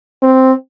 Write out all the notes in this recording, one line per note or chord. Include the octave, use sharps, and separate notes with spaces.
C4